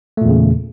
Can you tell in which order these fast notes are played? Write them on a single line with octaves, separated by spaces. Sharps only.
A3 A#2 E2 C#3